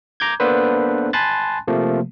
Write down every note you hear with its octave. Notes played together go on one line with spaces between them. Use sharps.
A#5 D6 G6 G#6
A#3 B3 D4 A4 B4 C5
G#5 A5 B5 C6 F#6 A6
C3 F3 A3 A#3